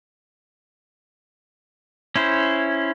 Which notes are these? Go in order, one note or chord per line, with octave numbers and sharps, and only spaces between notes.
C#4 E4 C5